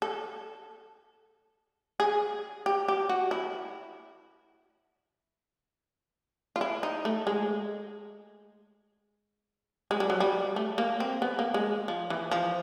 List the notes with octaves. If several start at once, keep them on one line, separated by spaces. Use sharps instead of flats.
A4
G#4
G4
G4
F#4
E4
F4
E4
D#4
A3
G#3
G#3
G3
F#3
G3
A3
A#3
C4
B3
A#3
G#3
F3
E3
F3